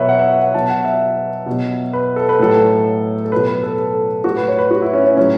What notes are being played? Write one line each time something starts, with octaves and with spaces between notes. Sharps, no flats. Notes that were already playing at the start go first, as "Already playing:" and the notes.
Already playing: B2 F#3 B4 C#5 E5
F#5
E5
F#5
F#5
B2 F#3 A5
F#5
E5
B2 F#3
B4
A4
B4
A2 F#3 A4
A4
B2 F#3 B4
B4
A4
A4
A2 F#3 F#4
B4
C#5
B4
F#4
E4
C#4
C#4
A2 F#3 C#4